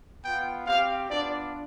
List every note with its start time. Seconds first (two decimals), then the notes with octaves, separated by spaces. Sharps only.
0.24 B3 F4 G5
0.66 C4 G4 F5
1.09 B3 D4 F4 D5